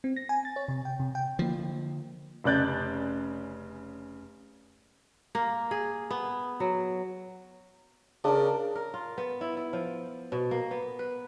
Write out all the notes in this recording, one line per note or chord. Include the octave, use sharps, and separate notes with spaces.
C4
A#6
G#5
A6
C#5
C3
G5
C3
G5
D3 F3 A#3
F1 C#3 D5 F#6 G6 A6
A#3
G#4
B3
F#3
C#3 D4 A#4
A#4
F4
B3
E4
E4
F3
B2
A#3
B3
B4